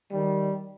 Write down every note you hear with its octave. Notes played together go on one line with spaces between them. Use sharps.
D#3 G3